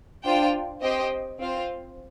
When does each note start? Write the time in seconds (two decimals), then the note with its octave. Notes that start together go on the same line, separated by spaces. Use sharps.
0.25 D4 F4 C5 G5
0.82 C4 G4 C5 D#5 G5
1.39 C4 F4 C5 F5